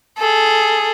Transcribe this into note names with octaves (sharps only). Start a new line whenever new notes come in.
G#4 A4